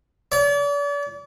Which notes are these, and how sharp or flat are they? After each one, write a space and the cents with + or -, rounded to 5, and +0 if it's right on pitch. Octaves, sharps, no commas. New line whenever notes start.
D5 -40